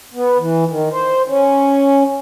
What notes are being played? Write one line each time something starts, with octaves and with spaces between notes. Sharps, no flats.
B3
E3
D#3
C5
C#4